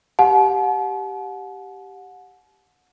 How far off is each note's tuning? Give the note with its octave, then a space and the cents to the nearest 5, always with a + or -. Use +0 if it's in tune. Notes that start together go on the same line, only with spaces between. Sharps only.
G4 -5 F#5 -25 A5 -45